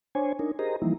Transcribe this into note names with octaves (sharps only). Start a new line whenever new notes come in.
D4 C5 C#5 G#5
D4 D#4 A#4
G4 G#4 A#4 C5 D#5 A#5
E3 F3 G3 A#3 D#4 E4